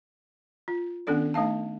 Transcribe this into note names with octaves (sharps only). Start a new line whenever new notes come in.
F4
D#3 B3 C#4 D4 A4 D5
A3 D#4 F5 A5